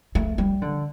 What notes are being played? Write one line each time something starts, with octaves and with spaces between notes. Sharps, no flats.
A3
G3
D3